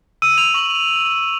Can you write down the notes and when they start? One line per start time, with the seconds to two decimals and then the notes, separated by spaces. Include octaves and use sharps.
0.22 E6 D#7
0.38 F7
0.54 C#6 F#7